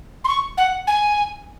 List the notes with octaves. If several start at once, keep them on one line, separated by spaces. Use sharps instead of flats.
C6
C#6
F#5
G#5